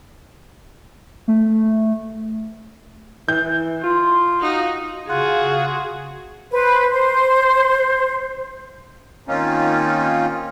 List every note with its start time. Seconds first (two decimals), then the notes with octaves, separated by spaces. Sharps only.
1.28 A3
3.29 E3 G6
3.84 F4 C6
4.40 D#4 F#4 F5
5.09 C#3 F4 F#4 G#4 F#5
6.51 B4 C5
6.89 C5
9.28 D#3 A#3 C4 C#4 D#4 F4